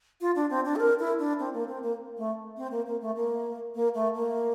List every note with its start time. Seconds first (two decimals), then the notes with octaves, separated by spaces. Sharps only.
0.21 F4
0.36 D4
0.50 C4
0.65 D4
0.76 A4
0.80 A#4
1.00 E4
1.19 D4
1.39 C4
1.54 A#3
1.68 C4
1.83 A#3
2.17 A3
2.57 C4
2.71 A#3
2.86 A#3
3.01 A3
3.16 A#3
3.75 A#3
3.94 A3
4.14 A#3